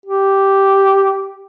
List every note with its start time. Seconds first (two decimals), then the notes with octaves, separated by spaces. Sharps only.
0.06 G4